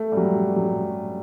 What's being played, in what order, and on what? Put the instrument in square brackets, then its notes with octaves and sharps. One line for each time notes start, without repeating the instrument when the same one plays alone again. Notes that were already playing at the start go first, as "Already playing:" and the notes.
Already playing: [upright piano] A3
G3
F#3
F#3